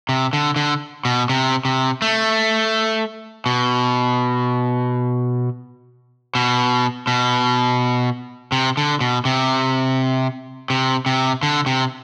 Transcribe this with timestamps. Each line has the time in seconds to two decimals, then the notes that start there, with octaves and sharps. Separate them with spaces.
0.09 C3
0.33 D3
0.56 D3
1.05 B2
1.29 C3
1.65 C3
2.02 A3
3.46 B2
6.35 B2
7.07 B2
8.52 C3
8.77 D3
9.01 B2
9.25 C3
10.70 C3
11.06 C3
11.43 D3
11.66 C3